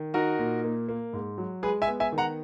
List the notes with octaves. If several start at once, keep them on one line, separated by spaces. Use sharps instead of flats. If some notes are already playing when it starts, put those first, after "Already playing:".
Already playing: D#3
D#4 F#4 A#4
A#2
A#3
A#3
G#2
F#3
G#3 G#4 B4
E5 G#5
B3
E5 G#5
D#3
F#5 A#5